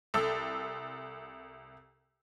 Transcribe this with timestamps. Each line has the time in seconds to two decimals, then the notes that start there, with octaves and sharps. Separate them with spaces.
0.14 C2 A4 E6